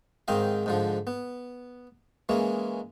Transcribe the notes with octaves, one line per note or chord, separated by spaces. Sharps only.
G#2 D#3 C4 D#5 F5
G#2 D3 F3
B3
E3 G#3 A#3 C#4